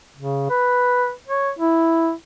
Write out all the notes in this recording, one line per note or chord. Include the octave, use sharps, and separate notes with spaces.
C#3
B4
C#5
E4